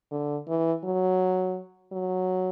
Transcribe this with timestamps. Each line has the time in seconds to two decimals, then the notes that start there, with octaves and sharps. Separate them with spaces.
0.12 D3
0.48 E3
0.84 F#3
1.92 F#3